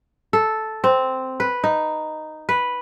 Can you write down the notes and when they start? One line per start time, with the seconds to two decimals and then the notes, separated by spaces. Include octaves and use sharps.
0.33 A4
0.84 C4
1.40 B4
1.64 D#4
2.49 B4